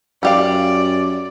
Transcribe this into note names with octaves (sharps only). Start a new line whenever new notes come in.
F#2 G3 G4 D5 F5